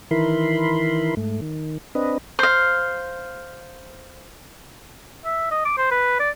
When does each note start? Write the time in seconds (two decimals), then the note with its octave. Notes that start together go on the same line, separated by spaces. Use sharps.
0.11 D#3 E3 E4 A#4 B5 C6
1.17 G#2 A3
1.42 D#3
1.95 C4 D4 B4 D#5
2.39 C5 F5
5.25 E5
5.51 D#5
5.65 D6
5.78 C5
5.91 B4
6.20 D5